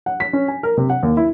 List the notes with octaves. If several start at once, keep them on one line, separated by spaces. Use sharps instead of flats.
F#5
B6
C#4
G#5
A#4
C3
F#5
D#2
E4